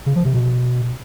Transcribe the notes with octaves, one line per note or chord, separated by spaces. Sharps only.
C#3
F3
C3
B2